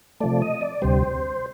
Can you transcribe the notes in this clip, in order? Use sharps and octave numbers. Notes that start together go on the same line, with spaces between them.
C3 F3 A3 D5
D#5
D5
D2 C3 G3 C5